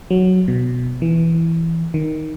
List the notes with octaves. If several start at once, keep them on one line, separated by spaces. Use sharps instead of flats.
F#3
B2
E3
D#3